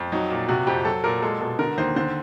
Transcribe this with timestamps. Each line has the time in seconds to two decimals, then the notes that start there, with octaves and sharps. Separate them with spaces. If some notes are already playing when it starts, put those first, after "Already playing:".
Already playing: F2
0.12 F#3 D#4
0.31 A#2
0.49 C3 F#4
0.67 F2 G4
0.85 F#3 A4
1.04 A#2 A#4
1.22 G#3 A4
1.40 B2 A4
1.59 D3 A#4
1.78 D#2 C5
1.96 D3 C5